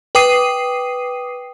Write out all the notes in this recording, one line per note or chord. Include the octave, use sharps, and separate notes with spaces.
B4 G5 D6 D#6 C7 D#7